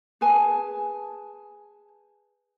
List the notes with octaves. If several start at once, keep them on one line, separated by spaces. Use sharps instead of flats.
G#4 B4 G#5 A5